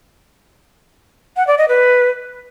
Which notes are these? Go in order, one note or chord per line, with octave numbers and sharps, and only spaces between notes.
F#5
D5
D#5
B4